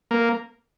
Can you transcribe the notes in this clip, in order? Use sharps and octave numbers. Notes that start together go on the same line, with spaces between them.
A#3